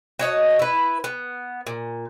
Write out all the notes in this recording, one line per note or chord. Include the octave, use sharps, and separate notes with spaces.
F#4 C#5 D#5 A5
E4 B4
B3
A#2